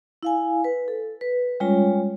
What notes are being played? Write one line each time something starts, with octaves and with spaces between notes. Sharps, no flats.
E4 F5 G#5
B4
A4
B4
G3 G#3 C#4 F4 C#5